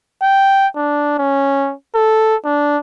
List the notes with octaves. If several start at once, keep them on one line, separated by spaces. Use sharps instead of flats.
G5
D4
C#4
A4
D4